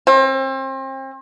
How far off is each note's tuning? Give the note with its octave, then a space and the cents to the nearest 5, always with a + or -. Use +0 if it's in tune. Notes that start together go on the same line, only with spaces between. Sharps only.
C4 +35